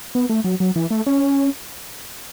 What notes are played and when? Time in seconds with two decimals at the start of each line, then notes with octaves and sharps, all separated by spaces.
0.15 B3
0.30 A3
0.44 F#3
0.60 F#3
0.76 E3
0.91 A3
1.07 C#4